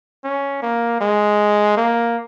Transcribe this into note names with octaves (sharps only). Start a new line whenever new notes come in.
C#4
A#3
G#3
A#3